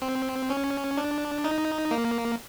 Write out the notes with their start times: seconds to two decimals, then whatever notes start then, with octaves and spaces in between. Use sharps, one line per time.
0.02 C4
0.50 C#4
0.97 D4
1.44 D#4
1.91 A#3